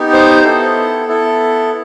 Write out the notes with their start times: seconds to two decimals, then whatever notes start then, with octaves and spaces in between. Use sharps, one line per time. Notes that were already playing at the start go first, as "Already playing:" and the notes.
Already playing: B3 D#4 G4
0.13 C5
0.44 B3 E4 A4
1.07 B3 E4 A4